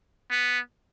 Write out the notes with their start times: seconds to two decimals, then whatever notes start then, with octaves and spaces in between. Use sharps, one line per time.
0.31 B3